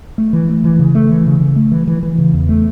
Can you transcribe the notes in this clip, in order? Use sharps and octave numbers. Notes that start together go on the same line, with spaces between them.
A3
E3
A3
E3
C#3
A3
E3
C#3
C#3
A3
E3
E3
E3
C#3
E2
A3